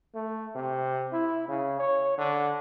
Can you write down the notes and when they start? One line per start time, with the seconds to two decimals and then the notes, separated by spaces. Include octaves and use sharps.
0.15 A3
0.55 C3
1.13 E4
1.48 C#3
1.79 C#5
2.18 D3